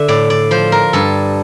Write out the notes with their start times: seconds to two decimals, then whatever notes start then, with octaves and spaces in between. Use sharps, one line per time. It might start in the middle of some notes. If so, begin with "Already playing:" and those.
Already playing: D3 E5
0.08 A2 D5
0.30 D5
0.51 F3 C5
0.72 A#4
0.93 G2 A4